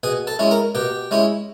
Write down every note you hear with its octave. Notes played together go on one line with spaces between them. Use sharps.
B2 G#4 G#5
A4 A5
G#3 C#4 E4
A#4 A#5
B2 G4 G5
G#3 C#4 E4